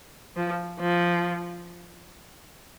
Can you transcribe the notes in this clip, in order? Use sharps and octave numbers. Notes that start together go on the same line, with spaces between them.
F3
F3